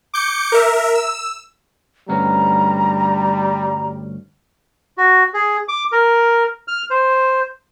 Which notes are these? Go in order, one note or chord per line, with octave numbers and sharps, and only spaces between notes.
D6 G6 C#7
A#4 E5
E6
D2 G2 G3 C#4 A#5
F#4
G#4
D6
A#4
F6
C5